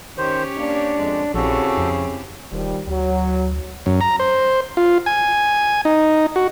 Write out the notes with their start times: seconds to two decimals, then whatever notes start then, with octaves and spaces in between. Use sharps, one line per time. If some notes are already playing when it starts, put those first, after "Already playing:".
0.18 D#3 C#4 G4 C5 C#5
0.58 A#3 D4
0.97 F2 G#3
1.34 A#1 C#3 C4 E4 F#4 G4 A4
1.78 F2
2.52 E1 D#3 F3 G3
2.87 D2 F#3
3.86 F#2
4.01 A#5
4.20 C5
4.77 F4
5.06 G#5
5.85 D#4
6.36 F#4